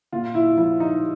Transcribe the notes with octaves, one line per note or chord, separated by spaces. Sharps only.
A#2 F4
E4
F3 E4
D#4